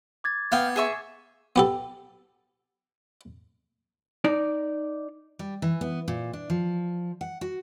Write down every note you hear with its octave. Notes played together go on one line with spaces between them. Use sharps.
D6 G#6 A6
B3 F5 G5
G#4 E5 C#6
B3 G4 A4
D#4 D5
G3
E3
B3
A#2
D4
F3
F#5
F#4